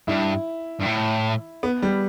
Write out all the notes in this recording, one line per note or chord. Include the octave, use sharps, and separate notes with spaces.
G2 E4
G2
A2
B3
G3